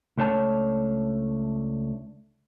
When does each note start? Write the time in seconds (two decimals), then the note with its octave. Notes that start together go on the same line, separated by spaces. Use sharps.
0.18 C#2 A3 D4 C#5 A5